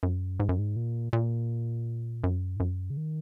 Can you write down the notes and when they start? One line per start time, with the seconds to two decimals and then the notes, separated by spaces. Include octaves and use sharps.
0.03 F#2
0.40 G#2
0.49 F#2
0.59 G#2
0.76 A#2
1.13 A#2
2.24 F#2
2.56 G#2
2.60 F#2
2.90 C#3
2.97 D#3